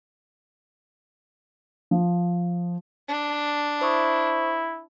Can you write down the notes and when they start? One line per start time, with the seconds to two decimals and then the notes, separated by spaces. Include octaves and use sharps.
1.91 F3
3.09 D4
3.81 E4 C5 C#6 D#6